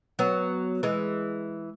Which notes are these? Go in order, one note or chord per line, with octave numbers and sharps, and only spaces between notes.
F#3 B3
E3 G#3